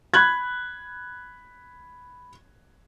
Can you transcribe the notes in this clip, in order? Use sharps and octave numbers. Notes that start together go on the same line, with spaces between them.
B5 F#6 G#6